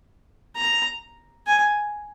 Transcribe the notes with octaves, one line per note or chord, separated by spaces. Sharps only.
A#5
G#5